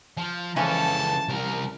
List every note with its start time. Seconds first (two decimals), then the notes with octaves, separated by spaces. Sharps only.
0.17 F3
0.56 C#2 E3 F3 C#4 A4 A5
1.28 C2 A#4